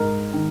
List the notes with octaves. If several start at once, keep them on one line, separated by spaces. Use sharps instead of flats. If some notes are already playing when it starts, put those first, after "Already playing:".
Already playing: G#2 A#4
D#3